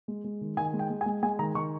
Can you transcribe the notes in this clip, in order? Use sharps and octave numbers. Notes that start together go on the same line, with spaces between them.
G#3
G#3
D#3
D#3 G#5
G#3
G5
G#3
G#5
G#3
G#3 G#5
D#3 A#5
D#3 C#6